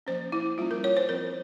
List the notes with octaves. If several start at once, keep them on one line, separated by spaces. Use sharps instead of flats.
F3 A#3 C#4 C5
E4
G3 A#3 C#4 F4
A#4
C#5
C5
F3 C4 A#4